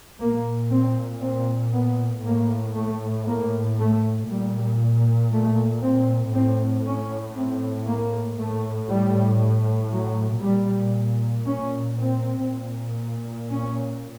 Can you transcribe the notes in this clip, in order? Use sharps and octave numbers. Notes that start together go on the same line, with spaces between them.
A#2 A#3
C4
C4
B3
A2 A#3
A3
A#3
A3
A#2 G3
A3
C4
A2 C4
C#4
C4
A#3
A2 A3
G3
F#3
A#2 G3
C#4
C4
A#2
C#4